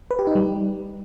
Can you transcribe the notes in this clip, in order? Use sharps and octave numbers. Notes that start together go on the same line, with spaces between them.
B4
G4
D#4
G3